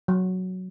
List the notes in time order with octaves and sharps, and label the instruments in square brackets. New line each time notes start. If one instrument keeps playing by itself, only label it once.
[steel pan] F#3